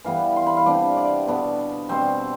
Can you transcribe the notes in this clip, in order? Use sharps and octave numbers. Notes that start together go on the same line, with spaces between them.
E3 G3 B3 F5
C6
B5
F5
C3 G3 B3 D4 D5
D5
B2 B3 D4
B2 G3 C4 C5